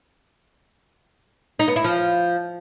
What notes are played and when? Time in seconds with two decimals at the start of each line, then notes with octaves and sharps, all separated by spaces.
1.59 D#4
1.68 B3
1.76 E4
1.84 F3